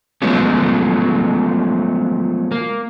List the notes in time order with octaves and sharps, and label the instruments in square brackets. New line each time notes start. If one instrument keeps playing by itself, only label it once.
[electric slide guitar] F3 F#3 G#3 A3 B3 C#4
A#3